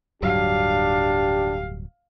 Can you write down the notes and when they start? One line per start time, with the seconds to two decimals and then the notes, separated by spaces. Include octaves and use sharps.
0.22 D1 G2 F#3 D4 G4 F5